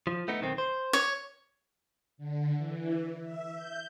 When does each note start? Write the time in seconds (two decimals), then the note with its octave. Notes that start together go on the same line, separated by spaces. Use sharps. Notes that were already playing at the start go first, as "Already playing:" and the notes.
0.07 F3
0.28 A3 B3 D#4
0.41 B1 D#3 C4
0.58 C5
0.93 C#5
2.17 D3
2.57 E3
3.23 E5
3.54 G6